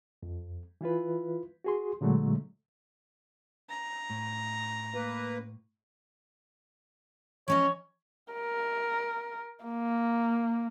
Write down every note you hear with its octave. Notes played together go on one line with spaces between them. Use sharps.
F2
E3 E4 F4 B4
F#4 G#4 C6
A#2 D3 F#3 G#3 A3
A#5
A2
A#3 B4
F3 C#4 C#5 D#5
A#4
A#3